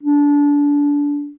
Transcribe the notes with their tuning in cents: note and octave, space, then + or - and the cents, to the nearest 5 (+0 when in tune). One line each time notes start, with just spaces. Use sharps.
D4 -25